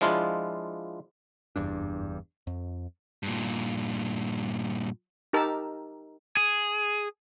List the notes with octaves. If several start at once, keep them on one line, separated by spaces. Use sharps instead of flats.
F3 G#3 D4 E4 F4
F#1 E2 G2 D4
F2
G2 A#2
D#4 G4 A#4 A5 E6
G#4